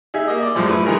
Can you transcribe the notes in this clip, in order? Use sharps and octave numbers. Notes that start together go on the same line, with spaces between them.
D#4 G#4 E5
A#3 D#5
D5
F#2 A2 F3 G3 G#3
A3 E4 B4
D#3 G#3 G4 G#4 A#4